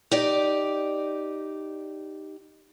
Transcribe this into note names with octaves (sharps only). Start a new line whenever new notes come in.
D#4 G4 D5